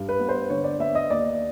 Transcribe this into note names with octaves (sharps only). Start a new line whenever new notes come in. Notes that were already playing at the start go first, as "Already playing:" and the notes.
Already playing: G2
B4
B3
C5
D3 C#5
D5
B3 E5
D#5
D#2 D5